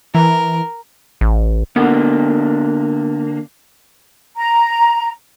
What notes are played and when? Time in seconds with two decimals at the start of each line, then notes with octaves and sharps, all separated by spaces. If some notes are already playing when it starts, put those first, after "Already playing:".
0.15 E3 A#4
1.21 A1
1.76 D3 A#3 B3
4.36 A#5